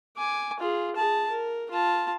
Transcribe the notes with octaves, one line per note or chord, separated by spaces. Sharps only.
G#5 D6
F4 G#4
G#4 A5
A#4
F4 A5